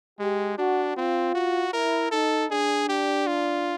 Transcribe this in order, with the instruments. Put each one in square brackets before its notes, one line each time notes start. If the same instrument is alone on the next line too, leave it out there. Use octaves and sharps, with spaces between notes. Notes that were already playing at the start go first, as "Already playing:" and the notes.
[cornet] G#3 [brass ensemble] G4
[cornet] D4 [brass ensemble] F#4
[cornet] C4 [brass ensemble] F4
[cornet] F#4
[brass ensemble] E4 [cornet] A#4
[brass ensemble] D#4 [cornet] A4
[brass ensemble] D4 [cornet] G#4
[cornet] G4
F4